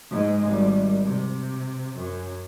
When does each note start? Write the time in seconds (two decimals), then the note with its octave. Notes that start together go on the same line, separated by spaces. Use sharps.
0.11 G#2 G#3
0.48 G#1 G3
1.06 C3
1.97 F#2